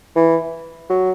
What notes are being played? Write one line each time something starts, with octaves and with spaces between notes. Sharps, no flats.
E3
F#3